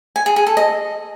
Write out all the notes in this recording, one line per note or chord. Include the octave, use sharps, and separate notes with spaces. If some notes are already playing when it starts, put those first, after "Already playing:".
G#5
G#4
G#4
A4
D#5